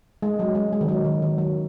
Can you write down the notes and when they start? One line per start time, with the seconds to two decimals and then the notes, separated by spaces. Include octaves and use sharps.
0.22 G#3
0.39 F#3
0.55 G#3
0.73 G#3
0.81 D#3
0.88 F#3
1.05 D#3
1.22 D#3
1.38 F#3